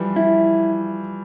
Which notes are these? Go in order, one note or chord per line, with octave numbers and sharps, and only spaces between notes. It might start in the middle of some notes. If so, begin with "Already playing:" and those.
Already playing: E3 F3 G3
E4